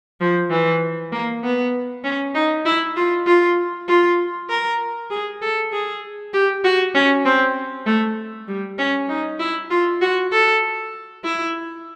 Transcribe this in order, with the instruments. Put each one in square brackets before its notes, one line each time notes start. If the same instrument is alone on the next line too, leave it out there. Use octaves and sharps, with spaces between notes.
[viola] F3
E3
A#3
B3
C#4
D#4
E4
F4
F4
F4
A#4
G#4
A4
G#4
G4
F#4
C#4
C4
A3
G3
C#4
D#4
E4
F4
F#4
A4
E4